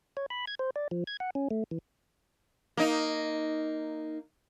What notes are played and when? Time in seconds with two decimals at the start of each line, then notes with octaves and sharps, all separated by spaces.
0.17 C#5
0.30 B5
0.47 G#6
0.59 C5
0.76 D5
0.91 F3
1.07 G#6
1.20 F#5
1.35 C#4
1.51 A3
1.71 E3
2.77 A#3 D#4